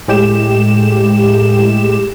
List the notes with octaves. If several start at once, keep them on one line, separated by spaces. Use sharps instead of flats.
A2 G#3 G4 E7